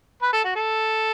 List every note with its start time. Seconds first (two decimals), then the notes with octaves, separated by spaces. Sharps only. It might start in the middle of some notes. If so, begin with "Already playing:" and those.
0.22 B4
0.33 A4
0.44 F#4
0.55 A4